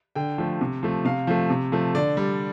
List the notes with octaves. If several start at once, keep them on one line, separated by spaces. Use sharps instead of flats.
D3 G5
F3 A3
C3
F3 A3
C3 F5
F3 A3
C3
F3 A3
D3 D5
G3